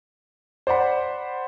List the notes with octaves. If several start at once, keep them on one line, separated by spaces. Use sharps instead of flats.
C5 D5 F#5 B5